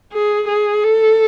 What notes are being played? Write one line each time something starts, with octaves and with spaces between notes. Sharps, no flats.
G#4
G#4
A4